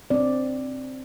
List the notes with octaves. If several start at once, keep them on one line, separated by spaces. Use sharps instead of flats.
C4 D5